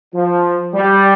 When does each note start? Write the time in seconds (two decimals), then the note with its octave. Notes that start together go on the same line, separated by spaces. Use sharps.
0.14 F3
0.74 G3